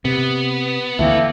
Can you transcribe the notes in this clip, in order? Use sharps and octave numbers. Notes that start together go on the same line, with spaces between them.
C3 B3
D2 E3 A3 A#3 C4